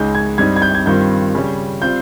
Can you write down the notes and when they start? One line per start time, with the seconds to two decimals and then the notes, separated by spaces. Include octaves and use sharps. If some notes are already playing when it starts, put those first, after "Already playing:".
Already playing: C#2 C#3 G#3 D#4 G6
0.15 G#6
0.38 G2 G3 C4 D#4 G#6
0.56 G#6
0.62 G6
0.75 G#6
0.86 G2 D#3 G3 C4 F4 G6
1.35 C#3 G3 C#4
1.82 G3 C4 F4 G6